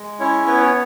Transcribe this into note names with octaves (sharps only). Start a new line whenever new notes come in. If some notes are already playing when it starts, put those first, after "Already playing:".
Already playing: G#3
C#4 E4 C#5
B3 B4
C#5